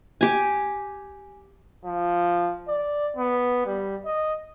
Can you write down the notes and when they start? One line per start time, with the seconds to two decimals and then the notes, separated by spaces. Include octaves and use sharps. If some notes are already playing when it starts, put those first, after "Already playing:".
0.21 G4 G#5
1.85 F3
2.68 D5
3.16 B3
3.66 G3
4.05 D#5